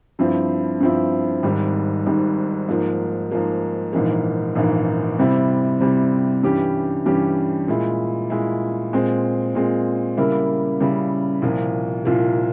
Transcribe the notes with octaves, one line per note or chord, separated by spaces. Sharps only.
G2 F3 C4 E4
G2 F3 C4 E4
G#1 G#2 G3
G#1 G#2 G3
G#2 F3 A#3
G#2 F3 A#3
A#1 G#2 E3 A#3
A#1 G#2 E3 A#3
C3 G3 C4 E4
C3 G3 C4 E4
G2 E3 G3 C#4 G4
G2 E3 G3 C#4 G4
A#2 G#3 E4
A#2 G#3 E4
A#2 G#3 C4
A#2 G#3 C4
C#3 G3 A#3 E4 A#4
C#3 G3 A#3 E4 A#4
C2 A#2 F3 A#3
C2 A#2 F3 A#3